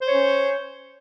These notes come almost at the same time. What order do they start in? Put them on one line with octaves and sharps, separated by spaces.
C5 C#5 C#4